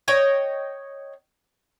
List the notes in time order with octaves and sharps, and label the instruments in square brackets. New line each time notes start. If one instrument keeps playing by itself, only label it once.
[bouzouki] C#5 D#5 G5